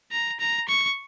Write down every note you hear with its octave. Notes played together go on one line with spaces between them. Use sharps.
A#5
A#5
C#6